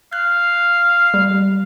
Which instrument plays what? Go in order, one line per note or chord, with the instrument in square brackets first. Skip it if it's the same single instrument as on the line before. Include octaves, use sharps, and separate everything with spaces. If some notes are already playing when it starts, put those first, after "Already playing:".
[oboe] F5 [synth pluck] F#6
[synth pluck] G3